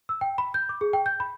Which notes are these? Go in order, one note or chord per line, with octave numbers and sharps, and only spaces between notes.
E6
G5
B5
G6
D6
G#4
G5
G6
B5